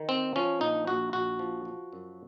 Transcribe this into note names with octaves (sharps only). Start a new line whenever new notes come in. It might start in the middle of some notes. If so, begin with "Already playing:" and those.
Already playing: D#3
C4
F3 C#4
A#1 D#4
A#1 F#4
A#1 F#4
F3
F3
F#2